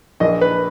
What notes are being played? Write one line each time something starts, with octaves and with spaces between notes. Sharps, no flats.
A#1 D#5
B4